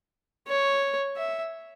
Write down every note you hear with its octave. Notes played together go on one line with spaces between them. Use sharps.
C#5
E5